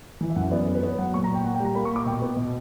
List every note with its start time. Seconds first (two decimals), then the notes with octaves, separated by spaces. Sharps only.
0.21 E3
0.30 E5
0.36 F#2 F#5
0.51 B3 D5
0.68 B3
0.75 B4
0.82 B3 C#5
0.98 F#3 F#5
1.14 A#2 C#6
1.24 A#5
1.29 A#2
1.34 G5
1.44 A#2 F#5
1.55 G5
1.60 G3
1.65 A#5
1.75 A#3 B5
1.85 C#6
1.91 A#2 D6
2.06 B2 G5
2.22 B3
2.37 B2